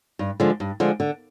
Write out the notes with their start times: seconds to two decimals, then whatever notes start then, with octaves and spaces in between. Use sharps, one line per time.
0.19 G2
0.40 D3 F3 G#3
0.60 G2
0.80 D3 F3 G#3
1.00 D3